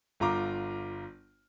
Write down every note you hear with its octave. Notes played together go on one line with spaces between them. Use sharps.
G1 F4 A#5 D6